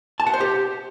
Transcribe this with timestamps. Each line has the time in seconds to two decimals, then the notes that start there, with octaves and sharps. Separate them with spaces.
0.20 A5
0.27 F#5
0.34 C5
0.40 G4